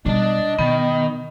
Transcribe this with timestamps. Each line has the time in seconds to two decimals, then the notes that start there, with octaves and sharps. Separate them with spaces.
0.06 B2 G3 D4 D#5 A5
0.59 B2 D#3 B3